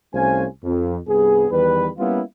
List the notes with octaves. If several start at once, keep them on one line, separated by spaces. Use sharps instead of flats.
C2 A3 C#4 C5 F5 G#5
F2
C2 G2 B3 G#4
E2 D#3 G3 B4
G3 A#3 B3 C#4 E4 F4